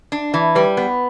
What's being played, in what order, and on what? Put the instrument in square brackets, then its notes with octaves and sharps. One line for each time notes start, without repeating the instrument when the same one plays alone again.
[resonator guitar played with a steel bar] D4
E3
[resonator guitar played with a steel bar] G3 [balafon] B4
[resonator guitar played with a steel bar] B3